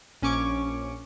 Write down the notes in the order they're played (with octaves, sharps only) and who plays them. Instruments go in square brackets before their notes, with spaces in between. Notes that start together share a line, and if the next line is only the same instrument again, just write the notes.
[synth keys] A#1 C#4 G#5 C#6 D6